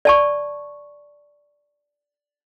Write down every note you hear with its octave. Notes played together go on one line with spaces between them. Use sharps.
D5 A5 C#6